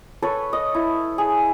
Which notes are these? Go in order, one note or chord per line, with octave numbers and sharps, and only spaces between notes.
A4 B4 C#5
D#5
E4
G#4